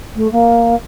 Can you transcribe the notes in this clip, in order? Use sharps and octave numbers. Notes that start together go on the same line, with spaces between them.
A3
A#3